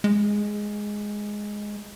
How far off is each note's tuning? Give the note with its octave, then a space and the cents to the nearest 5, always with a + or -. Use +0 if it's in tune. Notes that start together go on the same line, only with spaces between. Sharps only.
G#3 +0